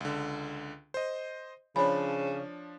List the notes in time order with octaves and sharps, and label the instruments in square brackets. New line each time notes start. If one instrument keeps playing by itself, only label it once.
[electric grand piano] C#2 D3
C5 D#5
[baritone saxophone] C#3 [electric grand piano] F3 D4 [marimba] C#5 G#5 B5